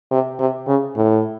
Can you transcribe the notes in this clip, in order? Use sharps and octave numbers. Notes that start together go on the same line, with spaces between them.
C3
C3
C#3
A2